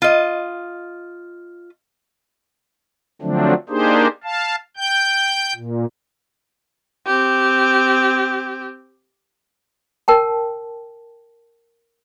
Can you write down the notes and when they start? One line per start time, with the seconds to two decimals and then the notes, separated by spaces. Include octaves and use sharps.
0.02 F4 D#5
3.22 D3 F3 F#3 A3 C4 D4
3.69 A#3 D4 D#4 G4 G#4 C5
4.24 F5 A5
4.77 G5 G6
5.55 A#2
7.07 C4 G4
10.08 A#4 G5 A5